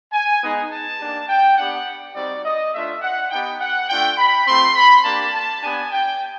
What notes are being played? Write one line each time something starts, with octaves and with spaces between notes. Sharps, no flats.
G#5
G#3 B3 D#4
A5
A#3 D4 G4
G5
B3 D4 G4 F#5
G3 C4 D#4 F#4 D5
D#5
A3 D4 F4 E5
F#5
B3 D#4 G4 G5
F#5
A3 D4 F4 G5
B5
A3 C4 F4 C6
B5
A#3 D4 G4 A5
A5
B3 D4 G4 G#5
G5